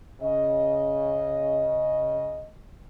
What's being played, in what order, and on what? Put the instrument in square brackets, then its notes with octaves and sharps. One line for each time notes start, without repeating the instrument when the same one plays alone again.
[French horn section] C#3 D#5